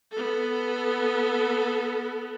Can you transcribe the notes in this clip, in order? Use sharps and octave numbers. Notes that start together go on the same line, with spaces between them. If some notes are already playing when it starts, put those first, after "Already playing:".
B3 A4